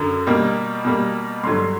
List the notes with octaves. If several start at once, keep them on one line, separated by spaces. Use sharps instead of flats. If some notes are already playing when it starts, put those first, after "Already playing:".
Already playing: F#2 D3
B2 G3 A#3
B2 G3 A#3
G2 D3 F#3 C6